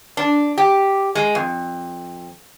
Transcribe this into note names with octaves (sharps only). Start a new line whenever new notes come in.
D4
G4
G#3
F2